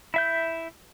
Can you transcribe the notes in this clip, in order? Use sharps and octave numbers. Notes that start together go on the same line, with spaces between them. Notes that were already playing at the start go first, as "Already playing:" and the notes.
E4 E5 G6